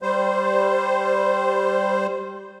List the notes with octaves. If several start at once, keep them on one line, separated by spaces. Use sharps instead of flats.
G3 C5